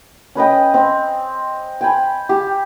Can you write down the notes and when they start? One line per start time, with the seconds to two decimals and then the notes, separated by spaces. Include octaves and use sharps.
0.35 C#4 B4 D#5 G5
0.74 C4
1.81 G5 G#5 B5
2.29 G4